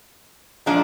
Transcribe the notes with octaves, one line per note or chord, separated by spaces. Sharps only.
A#2 F3 G#3 D4